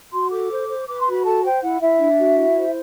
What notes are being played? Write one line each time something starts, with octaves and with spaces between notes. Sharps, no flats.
F#4 C6
A4 D6
C5
C5
B4 D6
C6
F#4
B5
A4 A5
C5 G5
E4 F#5
E4 E5
D4
F#4
E4
C5